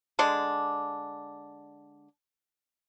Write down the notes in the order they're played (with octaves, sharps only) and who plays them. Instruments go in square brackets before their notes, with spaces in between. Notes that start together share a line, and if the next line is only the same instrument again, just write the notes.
[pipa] D3 G#3 D4